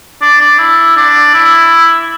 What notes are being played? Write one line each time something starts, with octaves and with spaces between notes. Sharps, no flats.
D4
D4
E4
D4
E4